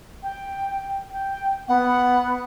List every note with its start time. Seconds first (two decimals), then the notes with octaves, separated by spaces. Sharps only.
0.23 G5
1.12 G5
1.68 B3 F#5